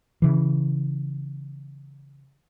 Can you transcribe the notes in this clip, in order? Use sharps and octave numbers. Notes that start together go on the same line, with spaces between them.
C#3 E3